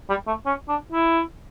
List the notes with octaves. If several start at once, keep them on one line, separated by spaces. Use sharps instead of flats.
G3
A3
C#4
D4
E4